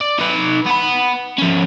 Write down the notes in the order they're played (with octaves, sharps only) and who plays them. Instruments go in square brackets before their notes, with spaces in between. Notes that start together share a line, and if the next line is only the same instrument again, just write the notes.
[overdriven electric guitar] D5
D#4 B4
B3 B5
F3 C#4